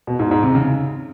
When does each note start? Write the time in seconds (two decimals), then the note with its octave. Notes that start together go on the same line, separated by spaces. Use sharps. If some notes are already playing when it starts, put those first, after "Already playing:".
0.07 B2
0.19 G#2
0.31 G#2
0.43 C3
0.55 C#3